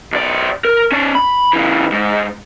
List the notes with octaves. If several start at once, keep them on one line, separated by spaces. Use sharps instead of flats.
B1 D5
A#4
C#4 D5
B5
C#3 E3
G#2 G#3